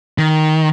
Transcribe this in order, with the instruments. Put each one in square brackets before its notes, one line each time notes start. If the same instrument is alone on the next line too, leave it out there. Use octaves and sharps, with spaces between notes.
[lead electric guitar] D#3